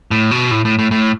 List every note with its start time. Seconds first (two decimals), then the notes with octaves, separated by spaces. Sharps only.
0.11 A2
0.31 B2
0.51 A2
0.65 A2
0.79 A2
0.91 A2